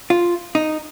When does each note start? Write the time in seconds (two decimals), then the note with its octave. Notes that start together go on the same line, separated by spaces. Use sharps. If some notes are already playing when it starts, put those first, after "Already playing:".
0.10 F4
0.55 D#4